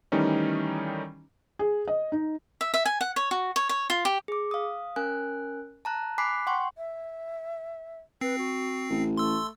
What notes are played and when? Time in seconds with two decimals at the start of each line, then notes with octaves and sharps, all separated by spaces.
0.12 D#3 E3 G3 A3 C#4 D#4
1.59 G#4
1.88 D#5
2.12 D#4
2.61 E5
2.74 E5
2.86 G#5
3.01 F#5
3.16 C#5
3.31 F#4
3.56 C#5
3.69 C#5
3.90 F4
4.05 G4
4.28 G#4 D6
4.51 F5 D#6
4.96 C#4 A#4 G#5 F#6
5.85 A5 A#5 F#6
6.18 G#5 B5 D6 F#6 B6 C7
6.47 F#5 G5 C6 C#6
6.77 E5
8.21 C4 B4 C7
8.38 F#4
8.90 A1
9.17 A3 C6 E6